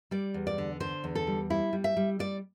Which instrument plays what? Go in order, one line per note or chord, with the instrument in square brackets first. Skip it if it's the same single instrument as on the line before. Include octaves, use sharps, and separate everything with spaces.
[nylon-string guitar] G3 D5
E2
D5
D3
D3 C5
E2
A4
G3
G3 E4
G3
E5
G3
G3 D5